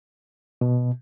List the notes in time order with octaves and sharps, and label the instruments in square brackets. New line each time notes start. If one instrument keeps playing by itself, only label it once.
[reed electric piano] B2